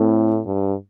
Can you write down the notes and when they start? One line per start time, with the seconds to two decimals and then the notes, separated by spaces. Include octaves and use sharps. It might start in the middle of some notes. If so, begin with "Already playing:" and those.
Already playing: A2 A3 C4 E4 A4
0.46 G2